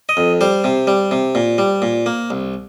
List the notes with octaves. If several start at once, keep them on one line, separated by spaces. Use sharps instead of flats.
D#5
F2
G3 C5
C3
G3
C3
A#2
G3
A#2
A#3
C2